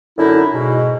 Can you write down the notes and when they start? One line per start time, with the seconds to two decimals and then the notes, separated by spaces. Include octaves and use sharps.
0.18 F#2 D3 D#4 E4
0.53 G#2 B2